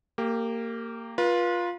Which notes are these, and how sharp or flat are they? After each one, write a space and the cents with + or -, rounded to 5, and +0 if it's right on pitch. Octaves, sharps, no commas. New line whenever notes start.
A#3 -20 G4 +5
F4 +5 B4 -35